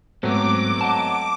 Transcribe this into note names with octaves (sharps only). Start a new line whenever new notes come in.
G#2 F#3 A3 B3 C4 D6
D#5 F#5 A5